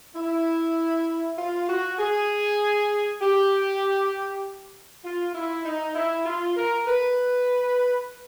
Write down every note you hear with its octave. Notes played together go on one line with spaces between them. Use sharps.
E4
F4
F#4
G#4
G4
F4
E4
D#4
E4
F4
A#4
B4